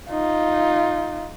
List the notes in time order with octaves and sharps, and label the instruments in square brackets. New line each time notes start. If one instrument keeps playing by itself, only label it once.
[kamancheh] D#4 F4